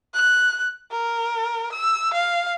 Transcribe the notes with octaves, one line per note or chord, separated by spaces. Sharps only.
F#6
A#4
E6
F5